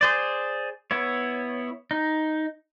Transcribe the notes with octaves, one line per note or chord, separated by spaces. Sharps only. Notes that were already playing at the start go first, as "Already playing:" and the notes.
G#4 C5 D5
B3 E4 C#5
D#4